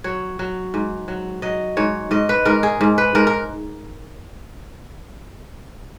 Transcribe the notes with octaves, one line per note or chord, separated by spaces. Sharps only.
F#3 C#5
F#3
G#2
F#3
F#3 D#5
G#2 C#5
G#2 D#5
B4
G#2 A#4
G#4
G#2
B4
G#2 A#4
A#4